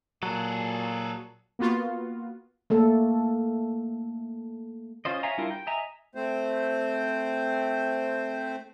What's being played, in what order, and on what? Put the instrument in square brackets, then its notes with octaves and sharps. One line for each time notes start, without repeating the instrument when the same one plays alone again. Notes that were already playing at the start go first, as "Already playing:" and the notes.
[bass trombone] A#2 [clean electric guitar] F#3 [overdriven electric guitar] G#4 A4
[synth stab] A#3 B3 F4 F#4
[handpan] A3 A#3 A4
[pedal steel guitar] C#4 F4 C5 D#5
C#5 E5 F5 G#5 A#5
G3 D4 E4 F4 A#4
G5
D#5 E5 G#5 A#5
[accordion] A3 C4 C5